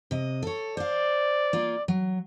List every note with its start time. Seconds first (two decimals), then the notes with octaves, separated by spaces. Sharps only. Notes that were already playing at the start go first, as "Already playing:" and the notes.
0.11 C3 D#5
0.43 A4 C#5
0.77 C5 D5 F5
1.53 A#3 F4
1.88 F#3